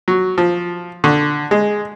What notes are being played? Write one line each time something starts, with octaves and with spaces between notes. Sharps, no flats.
F#3
F3
D3
G#3